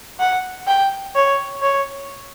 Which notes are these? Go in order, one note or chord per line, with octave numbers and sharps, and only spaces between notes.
F#5
G5
C#5
C#5